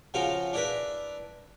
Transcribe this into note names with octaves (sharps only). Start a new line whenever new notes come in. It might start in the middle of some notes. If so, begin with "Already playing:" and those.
C#3 F3 F4 F#4 A#4
D4 E4 A#4 B4 E5